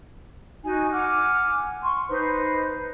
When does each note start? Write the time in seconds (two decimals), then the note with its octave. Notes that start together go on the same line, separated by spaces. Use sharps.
0.64 D#4 F#4 G#5
0.92 F#5 G#5 D6 F6
1.84 C6 C#6
2.09 D#4 B4 C5